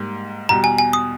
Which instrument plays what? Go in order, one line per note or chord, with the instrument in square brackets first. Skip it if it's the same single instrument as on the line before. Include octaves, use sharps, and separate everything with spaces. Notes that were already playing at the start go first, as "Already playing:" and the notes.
Already playing: [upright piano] G#2 G3 A#3
[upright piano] E2 B2 G3 [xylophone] A#5
[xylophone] G#5
G#5
D#6